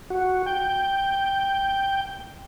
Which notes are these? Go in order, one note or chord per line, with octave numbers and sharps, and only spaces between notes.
F#4
G5